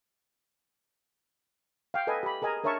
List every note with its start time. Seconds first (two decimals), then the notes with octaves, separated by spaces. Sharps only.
1.94 F5 G5
2.07 A4 B4 D#5 G#5
2.23 G4 B5
2.42 G#4 A#4 D#5 G#5 A#5
2.64 D4 A#4 C#5 E5 A5 C#6